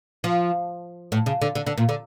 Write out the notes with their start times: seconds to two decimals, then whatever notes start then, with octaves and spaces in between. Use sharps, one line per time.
0.24 F3
1.12 A2
1.26 C#3
1.41 D3
1.55 D3
1.66 D3
1.78 A#2
1.89 D3